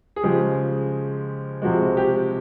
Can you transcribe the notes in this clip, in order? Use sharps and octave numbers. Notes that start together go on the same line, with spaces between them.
G#4
C#3 F3 G#3 G4
C3 F3 G#3 F#4
G4